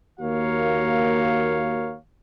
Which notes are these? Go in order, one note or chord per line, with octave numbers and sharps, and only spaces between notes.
D#2 A#3 F#4 A#4 C#5 F5